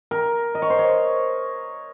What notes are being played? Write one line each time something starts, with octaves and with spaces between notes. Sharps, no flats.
A#4
D#5
C#5
C5
C#5